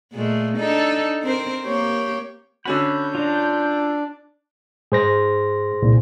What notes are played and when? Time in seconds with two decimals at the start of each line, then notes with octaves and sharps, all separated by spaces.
0.12 A#2 G#3 A3
0.57 D4 D#4 A4
1.23 C4 A#4 C5
1.65 A#3 G4 C#5
2.65 D3 C#4 F#4 B5 G6
3.15 D4 F4 A#5
4.92 G#2 G#4 C5 A#6
5.82 C2 A#2